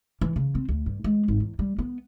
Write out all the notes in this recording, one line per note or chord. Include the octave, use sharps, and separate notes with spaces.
E3
C#3
C4
D2
G2
G#3
G#1
E2
G3
B3